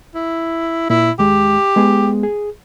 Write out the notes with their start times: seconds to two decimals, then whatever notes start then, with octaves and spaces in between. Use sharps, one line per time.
0.15 E4
0.90 A#2 E4
1.19 D#2 G#3 G4
1.76 G#3 B3 G#4
2.23 G#4